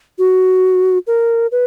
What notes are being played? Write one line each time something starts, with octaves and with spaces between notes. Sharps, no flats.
F#4
A#4
B4